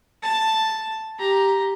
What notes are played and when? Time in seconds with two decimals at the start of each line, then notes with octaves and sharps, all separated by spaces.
0.23 A5
1.18 G4 A#5